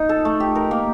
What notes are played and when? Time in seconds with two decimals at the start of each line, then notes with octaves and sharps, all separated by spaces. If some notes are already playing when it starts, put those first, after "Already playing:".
Already playing: D#4
0.09 A4
0.25 A3
0.40 G4
0.55 A#4
0.71 A#3